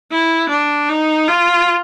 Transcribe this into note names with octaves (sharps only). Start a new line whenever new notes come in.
E4
D4
D#4
F4